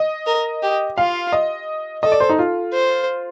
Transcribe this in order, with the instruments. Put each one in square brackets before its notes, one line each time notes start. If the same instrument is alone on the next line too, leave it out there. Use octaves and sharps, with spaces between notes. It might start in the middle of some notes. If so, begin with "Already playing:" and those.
Already playing: [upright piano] D#5
[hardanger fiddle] A#4
G4
[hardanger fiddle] F4 [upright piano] F5
[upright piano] D#5
[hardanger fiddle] A4 [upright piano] D#5
[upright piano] D5
C5
D#4
F4
[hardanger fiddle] C5